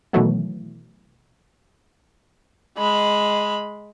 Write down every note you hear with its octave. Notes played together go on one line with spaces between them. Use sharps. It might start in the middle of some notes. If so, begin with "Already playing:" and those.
B2 D#3 E3 F#3 A3 B3
G#3 B5